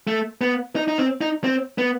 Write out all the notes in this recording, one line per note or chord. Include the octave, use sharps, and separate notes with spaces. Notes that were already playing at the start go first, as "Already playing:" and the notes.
A3
B3
D#4
D#4
C4
D#4
C4
B3